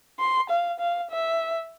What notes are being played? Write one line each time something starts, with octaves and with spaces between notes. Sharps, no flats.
C6
F5
F5
E5